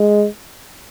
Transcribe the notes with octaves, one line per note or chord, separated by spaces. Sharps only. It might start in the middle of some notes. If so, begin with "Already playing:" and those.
Already playing: G#3